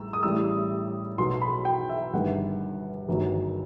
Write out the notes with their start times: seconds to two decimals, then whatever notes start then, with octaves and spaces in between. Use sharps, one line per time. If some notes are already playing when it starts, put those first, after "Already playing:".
Already playing: A1 G3 E6
0.13 D#6
0.23 A1 A2 G3 E6
1.18 B1 B2 F#3 C6
1.42 B5
1.65 G5
1.89 E5
2.13 G1 G2 D#3 F#5
3.08 G1 F#2 D#3 F#3